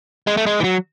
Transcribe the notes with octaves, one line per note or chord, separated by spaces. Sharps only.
G#3
A3
G#3
E3
F#3